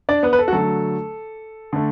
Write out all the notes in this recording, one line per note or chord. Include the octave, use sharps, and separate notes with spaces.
D4 D5
B3 B4
B4
A4
F#4
D3 F#3 A3 A4
D3 A3